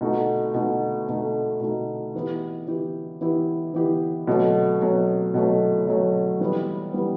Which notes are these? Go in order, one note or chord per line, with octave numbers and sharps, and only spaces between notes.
B2 A3 D#4 F#4
B2 A3 D#4 F#4
B2 A3 D#4 F#4
B2 A3 D#4 F#4
E3 B3 E4 G4
E3 B3 E4 G4
E3 B3 E4 G4
E3 B3 E4 G4
B2 F#3 A3
B2 F#3 A3
B2 F#3 A3
B2 F#3 A3
E3 G3 B3
E3 G3 B3